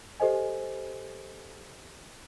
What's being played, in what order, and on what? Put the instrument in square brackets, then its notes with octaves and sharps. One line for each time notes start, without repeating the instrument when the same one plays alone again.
[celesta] G4 A4 C5 D#5 G#5